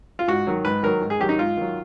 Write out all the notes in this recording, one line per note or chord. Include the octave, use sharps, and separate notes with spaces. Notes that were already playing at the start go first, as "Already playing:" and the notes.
F4
G#2 F#4
D#3 F#3
G#2 B4
D#3 F#3 A#4
G#2
G#4
D#3 F#3 G4
D#4
G#2 F4
D#3 F#3